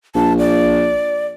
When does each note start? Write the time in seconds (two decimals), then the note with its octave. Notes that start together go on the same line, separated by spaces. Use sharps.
0.15 A#1 A5
0.39 D5